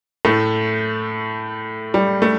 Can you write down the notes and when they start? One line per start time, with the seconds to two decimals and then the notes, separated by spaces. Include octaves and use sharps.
0.25 A2 A3
1.94 G3
2.22 A3